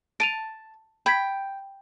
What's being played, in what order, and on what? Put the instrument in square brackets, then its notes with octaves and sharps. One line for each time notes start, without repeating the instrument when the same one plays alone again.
[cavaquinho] A5 [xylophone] D7 D#7 F7
[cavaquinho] G5 [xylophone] B5 G#6 B6